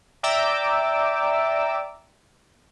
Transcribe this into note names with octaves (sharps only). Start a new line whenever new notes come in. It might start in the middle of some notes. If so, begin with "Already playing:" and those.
D5 E5 G5 A#5 D6 E6